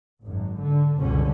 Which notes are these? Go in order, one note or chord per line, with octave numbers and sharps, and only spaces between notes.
G#1 F#2
D3
F#1 C#2 G2 B2 D3 C#4